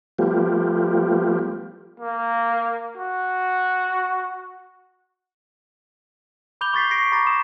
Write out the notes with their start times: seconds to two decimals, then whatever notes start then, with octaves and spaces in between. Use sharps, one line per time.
0.19 F3 G3 A3 B3 F4 G4
2.00 A#3
2.97 F#4
6.61 B5 D6 G6 F7 G7
6.74 C#6 G6 A6 B6 C7
6.91 C#6 A#6 C7 D7
7.12 A#5 B5 C#6 D6 A6 A#6
7.26 C6 D6 D#6 E7